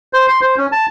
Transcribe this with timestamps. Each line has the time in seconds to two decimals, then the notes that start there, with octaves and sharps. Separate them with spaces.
0.13 C5
0.28 C6
0.41 C5
0.58 C#4
0.72 A5